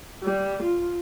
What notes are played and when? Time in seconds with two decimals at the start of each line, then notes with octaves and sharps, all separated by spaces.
0.23 G3
0.63 F4